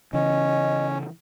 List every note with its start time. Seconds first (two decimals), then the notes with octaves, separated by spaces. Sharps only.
0.13 C#3 E3 C#4 D#5